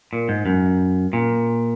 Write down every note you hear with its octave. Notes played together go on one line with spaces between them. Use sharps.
A#2
G#2
F#2
A#2